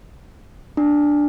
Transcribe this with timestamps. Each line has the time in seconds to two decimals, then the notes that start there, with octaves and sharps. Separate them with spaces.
0.77 D4